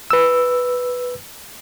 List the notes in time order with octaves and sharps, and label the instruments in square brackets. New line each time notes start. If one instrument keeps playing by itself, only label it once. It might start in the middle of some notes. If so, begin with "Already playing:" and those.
[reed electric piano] B4 E6